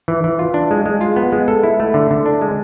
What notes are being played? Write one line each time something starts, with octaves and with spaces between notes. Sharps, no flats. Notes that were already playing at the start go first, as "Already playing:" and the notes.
E3
E3
F4
D4
G#3
G#3
F4
B3
G#3
A4
E4
A3
D3
D3
D4
G#3